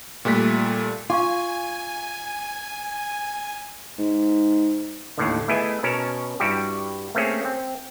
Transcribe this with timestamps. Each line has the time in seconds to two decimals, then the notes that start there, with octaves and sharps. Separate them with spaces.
0.25 A#2 G3 A3 F#6 B6
1.10 F4 F5 G#5 C#6 D6
3.99 G#2
5.18 D#2 A2 D3
5.48 A3 B3 E4 G#4 D#5 G#5
5.83 B2 C#4 A#4 A5
6.40 G2 G3 E4 F#4 G4
7.15 A3 A#3 C4 C#4 G#4
7.45 C4